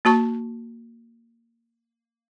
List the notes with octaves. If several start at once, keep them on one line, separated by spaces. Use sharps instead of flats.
A#3 F#4 A5 C#6